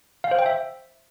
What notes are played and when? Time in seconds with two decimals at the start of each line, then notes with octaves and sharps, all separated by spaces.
0.24 F5
0.31 C5
0.39 G5
0.46 E5